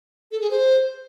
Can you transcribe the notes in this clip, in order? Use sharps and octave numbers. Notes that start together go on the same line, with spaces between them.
A4
G#4
C5